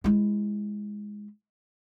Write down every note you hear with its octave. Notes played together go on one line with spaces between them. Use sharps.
G#3 E4